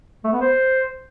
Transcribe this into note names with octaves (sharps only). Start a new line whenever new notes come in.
A3
B3
C5